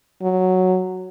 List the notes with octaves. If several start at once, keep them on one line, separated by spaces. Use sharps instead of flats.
F#3